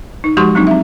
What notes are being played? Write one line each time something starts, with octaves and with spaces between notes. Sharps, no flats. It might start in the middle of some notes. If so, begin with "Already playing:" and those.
D#4
F3 G#3 F#4 G4 C6 C#6
F#3 C4 D4 D#4
C4 E5